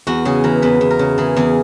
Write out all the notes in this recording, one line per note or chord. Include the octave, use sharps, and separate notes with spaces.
E2 F#4
C#3 G#4
E3 A#4
E2 B4
E2
A#4
C#3
E3 G#4
E2 G#4